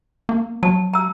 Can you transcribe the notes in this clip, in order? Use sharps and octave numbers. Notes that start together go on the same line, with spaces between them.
A#3
F#3 A5
A#5 E6